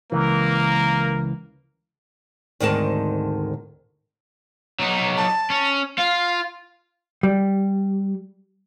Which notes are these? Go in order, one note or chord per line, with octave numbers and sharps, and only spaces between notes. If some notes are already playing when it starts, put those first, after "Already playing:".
C#2 E3 A#3 A#4
D2 G#2 D#3 C4 A#4 A5
F#3 D#4
A5
C#4
F4 F5
G3